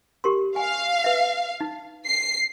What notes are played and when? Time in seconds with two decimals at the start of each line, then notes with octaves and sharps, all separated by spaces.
0.24 G4 A#4 C6
0.56 F5 G#5
1.04 B4 E5
1.61 D#4
2.06 C7